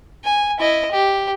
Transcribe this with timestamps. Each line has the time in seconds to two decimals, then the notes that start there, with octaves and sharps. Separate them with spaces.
0.24 G#5
0.59 E4 D#5
0.91 G4